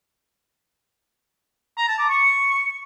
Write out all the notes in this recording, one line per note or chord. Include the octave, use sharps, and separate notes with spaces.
A#5
A5
D6
C#6